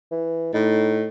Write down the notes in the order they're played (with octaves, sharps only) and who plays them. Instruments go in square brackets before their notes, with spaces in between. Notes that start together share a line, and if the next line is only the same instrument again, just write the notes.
[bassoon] E3
[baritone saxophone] A2 [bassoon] D#4